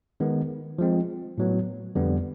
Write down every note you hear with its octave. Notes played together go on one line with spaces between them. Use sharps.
D#3 G#3 B3
F3 G#3 C4
A2 F#3 B3
F2 D3 G3 B3